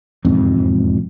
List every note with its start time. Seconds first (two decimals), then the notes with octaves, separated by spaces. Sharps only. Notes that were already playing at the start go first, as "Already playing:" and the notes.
0.25 E1 F2 G#2 C4